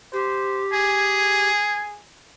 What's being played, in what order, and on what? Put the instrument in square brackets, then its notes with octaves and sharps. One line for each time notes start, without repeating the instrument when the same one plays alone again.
[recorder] G4 [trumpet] C5
[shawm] G#4 [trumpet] G#5